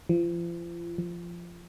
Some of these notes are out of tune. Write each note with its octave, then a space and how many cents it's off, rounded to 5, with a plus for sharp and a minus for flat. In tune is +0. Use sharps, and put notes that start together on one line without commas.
F3 -35
F3 -15